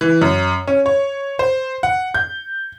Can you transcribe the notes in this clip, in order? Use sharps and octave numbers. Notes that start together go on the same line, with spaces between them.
E3
F#2
C#4
C#5
C5
F#5
G6